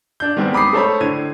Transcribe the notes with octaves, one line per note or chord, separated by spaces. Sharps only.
D4 G6
D#3 G3 G#3 B3 C4
B5 D6 D#6 C7
A3 A4 C5 C#5 B5
A2 D3 G#6 D#7